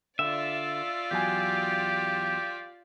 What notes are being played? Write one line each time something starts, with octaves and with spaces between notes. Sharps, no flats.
D3 F4 D5 E5
E2 F#3 G4 G#5